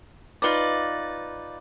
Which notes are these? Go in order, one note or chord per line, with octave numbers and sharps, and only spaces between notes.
D#4 F4 B4 D5